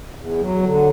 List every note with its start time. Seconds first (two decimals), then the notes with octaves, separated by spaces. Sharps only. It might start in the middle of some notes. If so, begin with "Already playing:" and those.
0.15 E2
0.38 F#3
0.62 D3